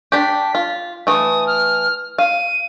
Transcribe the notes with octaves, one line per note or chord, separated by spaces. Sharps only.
D4 G4 B6
F4
E3 A3 D#6
F6
F5 D#7